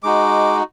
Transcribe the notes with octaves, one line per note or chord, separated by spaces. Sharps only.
G#3 D#4 F#4 D6